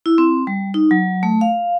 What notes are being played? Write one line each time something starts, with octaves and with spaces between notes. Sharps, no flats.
E4
C4
G3
D#4
F#3
A3
F5